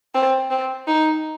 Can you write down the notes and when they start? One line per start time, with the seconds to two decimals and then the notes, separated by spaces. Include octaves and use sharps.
0.14 C4
0.50 C4
0.88 D#4